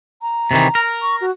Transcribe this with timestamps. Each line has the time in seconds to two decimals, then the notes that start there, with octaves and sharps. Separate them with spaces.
0.22 A#5
0.51 C3 D#3 E3
0.75 A#4
1.02 C#6
1.21 F#4